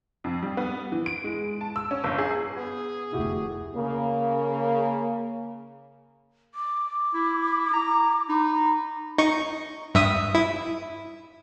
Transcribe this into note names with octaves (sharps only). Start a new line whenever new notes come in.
F2
G3
B3
E3
D7
G#3
A5
E6
C#4
G1
G#4
B3 G#4
F1 D2 A3 E4 F#4 G4
C#3 A#3
D6
E4
A#5
D#4 B5
D#4 C#6
G2 E5 D#6
E4